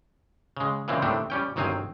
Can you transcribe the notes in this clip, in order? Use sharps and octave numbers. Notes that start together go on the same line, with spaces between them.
C#3 G#3
A#2 C#3 E3 G#3 C4
A2 D#3 G3 A3 C4 D4
G3 C#4 G5
G1 D#3 F#3 C4 F5 G#5